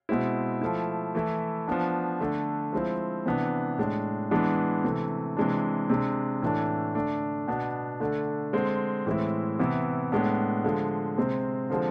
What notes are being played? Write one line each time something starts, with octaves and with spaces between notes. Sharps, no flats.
B2 G#3 C4 E4
F3 A3 E4
E3 A3 E4
F3 B3 D4
D3 A3 D4
F3 G#3 C4 E4
C3 E3 B3 D4
A2 G#3 D4
E3 G#3 B3 D4
C3 E3 A3
C3 E3 G#3 D4
C3 G#3 D4
A2 E3 A3 D4
D3 A3 D4
B2 B3 D4
D3 A3 D4
D3 G#3 C4
A2 E3 G#3 C4 E4
C3 E3 B3 E4
A2 G#3 B3 D4
D3 F3 G#3
C3 G#3 C4
D3 F3 G#3 C4